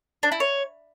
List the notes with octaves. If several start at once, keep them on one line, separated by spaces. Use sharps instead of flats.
D4
E4
C#5